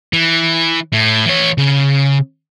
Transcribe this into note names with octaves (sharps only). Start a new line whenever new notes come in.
E3
A2
E3 C#5
C#3